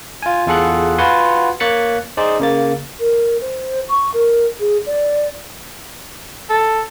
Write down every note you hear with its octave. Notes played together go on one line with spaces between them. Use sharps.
F4 G#5
E2 F4 G#4 A4 F#5 F#6
F4 F#4 B4 F#5 G#5 C6
A#3 C#5 F#6 A6 B6 C#7
D#4 G#4 C5 D5
C#3 A#3 A6
A#4
C5
C#6
A#4
G#4
D5
A4